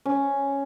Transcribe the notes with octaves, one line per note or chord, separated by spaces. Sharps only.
C#4